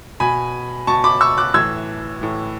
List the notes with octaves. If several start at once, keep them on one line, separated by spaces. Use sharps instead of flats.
B2 G#5 B5
B2 A5 C#6
B5 D6
C#6 E6
D6 F#6
A2 E3 E6 G#6
A2 E3